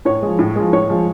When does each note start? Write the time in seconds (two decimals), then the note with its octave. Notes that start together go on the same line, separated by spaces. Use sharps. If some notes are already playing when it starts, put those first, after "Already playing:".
0.05 A2 C#5
0.22 F3 G#3
0.39 A2
0.56 F3 G#3
0.73 A2 C#5
0.90 F3 G#3